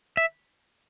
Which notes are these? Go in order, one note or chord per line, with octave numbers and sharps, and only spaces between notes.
E5